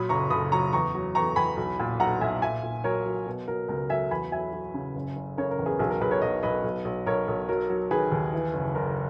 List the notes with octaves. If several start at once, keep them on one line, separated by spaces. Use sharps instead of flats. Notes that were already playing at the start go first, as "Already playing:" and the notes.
Already playing: A#2 F#3 B5 D#6
F#1 A#5 C#6
F#1 B5 D#6
F#3 A#5 C#6
E2 A#5 C#6
F#3
E2 A#5 C#6
E2 G#5 B5
B1
A#2
B1 F#5 A#5
B1 E5 G#5
A#2 E5 G#5
A#2
F#3 A#4 C#5
F#3
B2
F#3 A#4
C#2 A#4
F#3 E5 G#5
E2 G#5 B5
F#3 E5 G#5
F#3
C#3
F#1
F#1
C#3 A#4 C#5
A#4
E2
G#4 B4
B1 G#4
A#4
B1 G#4 B4
A#4 C#5
B1 B4 D#5
B1 B4 D#5
B1
B1
B1 A#4 C#5
B1
F#3 A#4
F#3
D#3 G#4 B4
D#2
E3
F#1
F#1 A#4